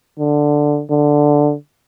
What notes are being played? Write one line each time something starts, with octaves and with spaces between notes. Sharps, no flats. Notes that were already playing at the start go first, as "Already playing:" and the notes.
D3
D3